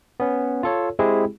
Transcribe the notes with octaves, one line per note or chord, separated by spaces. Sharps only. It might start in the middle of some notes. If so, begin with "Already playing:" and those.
B3 C#4
F4 A4 C#5
G#3 C4 E4 G4 G#4